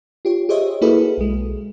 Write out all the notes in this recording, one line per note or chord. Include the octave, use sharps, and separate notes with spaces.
F4 G4 C#5
G4 G#4 C5 C#5 D#5 E5
A#3 E4 F#4 G#4 A4 B4
B1 G#3